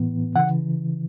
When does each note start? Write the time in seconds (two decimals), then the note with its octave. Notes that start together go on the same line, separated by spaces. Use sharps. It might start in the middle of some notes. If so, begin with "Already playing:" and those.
Already playing: A2 E3 B3
0.36 C#3 E3 F#5